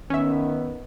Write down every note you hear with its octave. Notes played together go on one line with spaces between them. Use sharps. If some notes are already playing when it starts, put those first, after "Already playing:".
D#3 B3 C#4 E5